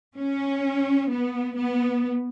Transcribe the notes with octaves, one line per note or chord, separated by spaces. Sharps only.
C#4
B3
B3